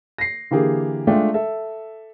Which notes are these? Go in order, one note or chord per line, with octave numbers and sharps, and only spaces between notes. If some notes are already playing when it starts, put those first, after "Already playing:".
A#6 C7
D3 E3 A#3 G4 G#4
G#3 A3 D4 F4 G5
A4 E5